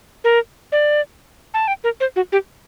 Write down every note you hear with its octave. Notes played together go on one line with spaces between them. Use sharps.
A#4
D5
A5
G5
A#4
C5
F#4
G4